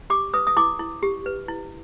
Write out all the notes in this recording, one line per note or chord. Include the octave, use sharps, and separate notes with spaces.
G4 D6
B4 D#6
D#6
E4 D6
E4
G4
B4
E4